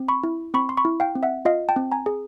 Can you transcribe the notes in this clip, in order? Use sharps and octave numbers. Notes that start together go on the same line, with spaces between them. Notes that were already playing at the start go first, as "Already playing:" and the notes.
Already playing: C4
B5 C#6
E4
C4 B5 C#6
C6
B5 C#6
E4
F5 G5
C4
E5 F#5
F4 D#5 F5
G5 A5
C4
G#5 A#5
G#4